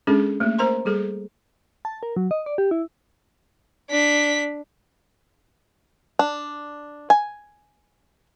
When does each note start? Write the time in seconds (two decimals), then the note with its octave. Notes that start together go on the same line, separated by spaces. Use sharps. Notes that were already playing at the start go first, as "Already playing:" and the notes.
0.07 G#3 C#4 D4 G#4 A4
0.40 A3 A#3
0.59 A#4 C5 A#5 C6
0.85 G3 G#4 A4
1.85 A5
2.03 A#4
2.16 F#3
2.31 D#5
2.46 D5
2.58 G4
2.71 E4
3.90 D4 B6
6.19 D4
7.10 G#5